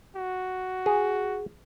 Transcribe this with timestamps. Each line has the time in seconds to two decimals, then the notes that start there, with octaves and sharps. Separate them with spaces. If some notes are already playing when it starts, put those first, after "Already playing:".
0.16 F#4
0.86 G#4